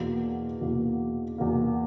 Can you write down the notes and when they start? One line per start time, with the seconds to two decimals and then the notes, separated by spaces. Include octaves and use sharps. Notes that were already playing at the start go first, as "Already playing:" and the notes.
Already playing: E2 B2 A#3
0.61 E2 B2 A#3
1.38 E2 B2 A#3